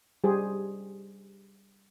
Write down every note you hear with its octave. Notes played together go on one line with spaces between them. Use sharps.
G3 G4 G#4 C5